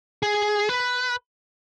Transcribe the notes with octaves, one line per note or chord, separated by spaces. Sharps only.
G#4
B4